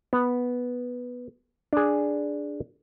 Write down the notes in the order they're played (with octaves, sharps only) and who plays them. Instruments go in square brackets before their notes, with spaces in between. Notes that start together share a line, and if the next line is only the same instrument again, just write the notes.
[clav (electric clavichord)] B3
D4 G#4